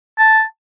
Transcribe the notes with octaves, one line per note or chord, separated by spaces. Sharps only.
A5